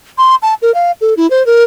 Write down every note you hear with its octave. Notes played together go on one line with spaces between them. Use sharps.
C6
A5
A#4
F5
A4
E4
C5
A#4